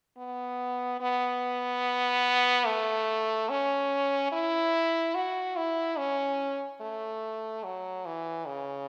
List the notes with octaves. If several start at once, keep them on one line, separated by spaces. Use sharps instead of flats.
B3
B3
A3
C#4
E4
F#4
E4
C#4
A3
F#3
E3
C#3